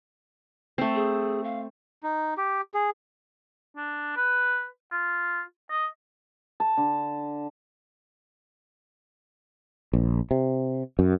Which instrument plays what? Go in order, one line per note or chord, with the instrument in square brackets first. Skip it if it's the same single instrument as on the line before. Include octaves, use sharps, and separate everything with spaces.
[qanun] A3 C4
[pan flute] G#4
F5
[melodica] D#4
G4
G#4
[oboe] D4
B4
F4
D#5
[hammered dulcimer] A5
D3
[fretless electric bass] A#1
C3
F#2